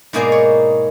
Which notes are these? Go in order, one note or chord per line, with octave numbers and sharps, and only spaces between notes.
G#2 B2 A#3 D#4 G#4 D5
C#5